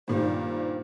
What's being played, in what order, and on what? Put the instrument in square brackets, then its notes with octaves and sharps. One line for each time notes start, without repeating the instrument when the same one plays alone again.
[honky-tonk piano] G2 A#2 D#3 [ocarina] C5